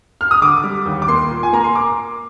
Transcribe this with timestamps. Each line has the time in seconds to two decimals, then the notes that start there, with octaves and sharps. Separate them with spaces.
0.21 F6
0.31 D#6
0.42 D3 D6
0.64 G3
0.85 D#2
1.02 D6
1.08 A#3 C6
1.31 A#2
1.43 G#5
1.53 A#3 A#5
1.64 C6
1.75 D6